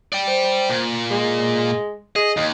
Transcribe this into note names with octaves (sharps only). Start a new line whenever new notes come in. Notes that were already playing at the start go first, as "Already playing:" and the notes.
D5 G5
C5
A#2
G#3
G#4 D#5
D#2 D#5